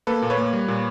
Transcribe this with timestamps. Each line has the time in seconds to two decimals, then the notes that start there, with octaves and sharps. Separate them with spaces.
0.07 A#3 A4 B4
0.22 A#2
0.30 B4 C#5
0.38 A#3
0.53 G3
0.68 A#2